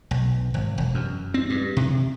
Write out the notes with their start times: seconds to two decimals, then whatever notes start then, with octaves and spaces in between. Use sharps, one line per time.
0.11 B1
0.54 G#1
0.78 E1
0.94 F#2
1.34 C4
1.50 G2
1.77 C3